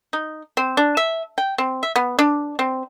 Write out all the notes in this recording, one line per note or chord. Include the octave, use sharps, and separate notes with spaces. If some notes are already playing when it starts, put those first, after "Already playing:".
D#4
C4
D4
E5
G5
C4
E5
B3
D4
C4